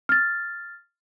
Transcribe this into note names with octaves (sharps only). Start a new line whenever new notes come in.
F6 A6